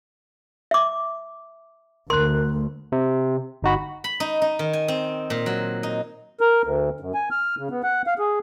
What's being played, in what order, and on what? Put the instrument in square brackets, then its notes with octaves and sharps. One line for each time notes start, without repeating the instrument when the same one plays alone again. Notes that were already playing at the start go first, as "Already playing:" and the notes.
[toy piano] E5 D6
[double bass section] D2 [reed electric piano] A#4 F#6 [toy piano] C6
[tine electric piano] C3
G1 D#4 F#4 B5
[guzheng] B5
D#4
D#4
D#3
G#5
C4
A#2
F#3
D#4
[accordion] A#4
D2
F#2
G#5
F6
C#3
B3
F#5
F5
G#4